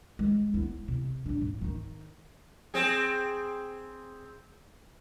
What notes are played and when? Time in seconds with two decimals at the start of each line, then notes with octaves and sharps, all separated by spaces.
0.19 G#3
0.54 B3 E4
0.88 C3
1.26 D#1 D4
1.42 G#2
1.61 D#3 D#4
2.74 C4 G#4